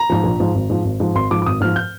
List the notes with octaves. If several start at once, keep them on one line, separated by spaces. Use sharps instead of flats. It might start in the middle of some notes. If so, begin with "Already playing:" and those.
Already playing: A#5
G#2 F3
A#1
G#2 F3
G#1
G#2 F3
G#1
G#2 F3
G#1 C6
G#2 F3 D6
D6
G#1 D#6
G#2 F3 F6
G6